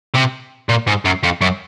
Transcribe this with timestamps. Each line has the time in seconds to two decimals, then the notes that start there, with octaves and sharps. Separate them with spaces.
0.14 C3
0.69 A#2
0.87 G#2
1.05 F#2
1.23 F2
1.41 F#2